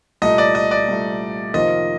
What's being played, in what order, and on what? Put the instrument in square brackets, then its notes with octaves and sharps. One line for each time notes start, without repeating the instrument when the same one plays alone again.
[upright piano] C2 A#2 A3 [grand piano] D#5
[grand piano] D5
D#5
D5
[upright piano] C2 A#2 A3
[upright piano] F2 C3 D#3 A#3 F4 [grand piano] D#5